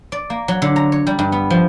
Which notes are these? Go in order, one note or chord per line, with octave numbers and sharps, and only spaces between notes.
D5
A#3
F#3
D3
A#5
C#5
G3
G2
B3
F3